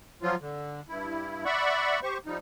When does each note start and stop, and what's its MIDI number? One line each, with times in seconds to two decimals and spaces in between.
0.22 0.36 53
0.22 0.36 54
0.22 0.36 65
0.41 0.81 50
0.89 1.44 43
0.89 1.44 64
1.45 2.00 74
1.45 2.00 76
1.45 2.00 78
1.45 2.00 83
1.45 2.00 85
2.03 2.18 67
2.03 2.18 72
2.03 2.18 85
2.26 2.38 53
2.26 2.38 55
2.26 2.38 63